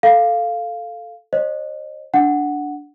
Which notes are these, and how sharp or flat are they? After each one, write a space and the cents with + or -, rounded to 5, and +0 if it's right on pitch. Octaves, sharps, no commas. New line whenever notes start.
A4 +0 F5 +0
C5 +45 D#5 -40
D4 -5 F#5 +0